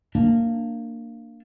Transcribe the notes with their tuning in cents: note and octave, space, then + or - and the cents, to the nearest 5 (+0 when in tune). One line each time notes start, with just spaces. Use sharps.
A#3 -15 D4 +0